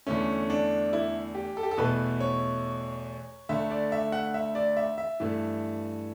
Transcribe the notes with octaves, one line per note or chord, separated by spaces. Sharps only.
E2 D3 A3 C#4
D4
E4
G4
A4
G4
A4
E2 B2 A3 B4
C#5
D2 D3 A3 E5
D5
E5
F#5
E5
D5
E5
E5
G2 E3 A3